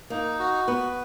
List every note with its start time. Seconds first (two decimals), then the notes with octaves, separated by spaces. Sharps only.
0.10 A#3 D#4
0.39 F#4
0.67 B3 B4